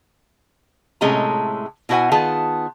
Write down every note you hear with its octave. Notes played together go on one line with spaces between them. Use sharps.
A2 C3 G#3 A3 C#4 A#5
B2 E4 F#4 C5 F#5 G#5
D#3 B3 F4 G#4 A5